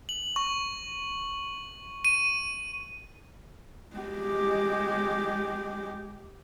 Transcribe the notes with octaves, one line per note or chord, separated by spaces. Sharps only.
F#7
C#6
D#7
G#3 G4